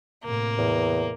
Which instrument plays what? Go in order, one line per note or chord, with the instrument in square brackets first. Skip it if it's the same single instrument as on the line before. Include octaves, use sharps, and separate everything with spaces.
[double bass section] A2 C3 [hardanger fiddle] A#3
[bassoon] E2